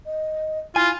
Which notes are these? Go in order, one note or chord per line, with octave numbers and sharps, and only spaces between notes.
D#5
E4 F4 G#5